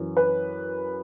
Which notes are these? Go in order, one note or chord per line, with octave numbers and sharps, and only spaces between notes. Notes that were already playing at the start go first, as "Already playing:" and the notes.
Already playing: F#2 E3
B4